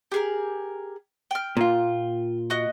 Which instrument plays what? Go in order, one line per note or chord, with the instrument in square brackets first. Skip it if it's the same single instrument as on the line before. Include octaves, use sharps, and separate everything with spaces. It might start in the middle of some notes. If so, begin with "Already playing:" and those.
[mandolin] G4 G#4 A#4
G5 F6
[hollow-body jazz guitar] A#2 F4
[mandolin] F#4 D#5